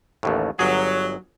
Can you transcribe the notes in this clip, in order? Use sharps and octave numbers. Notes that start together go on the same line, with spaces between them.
A1 D#2 A2
G1 F#3 G#4